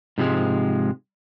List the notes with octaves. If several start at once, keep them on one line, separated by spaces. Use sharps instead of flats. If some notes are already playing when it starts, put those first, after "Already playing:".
G#2 C3 F3 G3 G#3